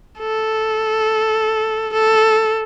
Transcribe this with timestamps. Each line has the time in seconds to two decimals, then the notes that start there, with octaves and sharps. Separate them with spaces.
0.19 A4
1.93 A4